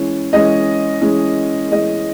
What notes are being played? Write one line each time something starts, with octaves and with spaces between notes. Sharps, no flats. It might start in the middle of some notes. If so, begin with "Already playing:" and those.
Already playing: E3 G#3 C#4
E3 G#3 C#4 D#5
E3 G#3 C#4
E3 G#3 C#4 D#5